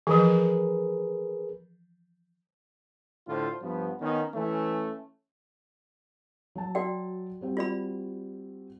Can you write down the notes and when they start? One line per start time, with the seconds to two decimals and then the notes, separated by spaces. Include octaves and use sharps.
0.07 E3 F3 G#4 A#4 B4
3.28 A2 D3 F4 C5
3.62 G2 F3 B3
4.01 D#3 B3 C#4 D#4
4.34 E3 A3 C#4
6.55 F#3 A5
6.75 F#4 D5 G5
7.41 G3 C4 F#4
7.57 F4 D5 B5